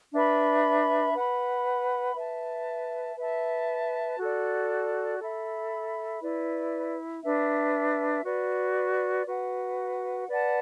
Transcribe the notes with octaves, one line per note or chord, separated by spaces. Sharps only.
D4 B4 E5 B5
B4 F#5 B5
B4 E5 A5
B4 E5 A5
F#4 A4 D5
A4 E5 B5
E4 B4 D5
D4 B4 E5
F#4 B4 D5
F#4 B4 F#5
B4 D5 F#5 A5